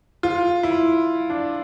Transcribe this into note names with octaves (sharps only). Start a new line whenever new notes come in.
F4
E4
D4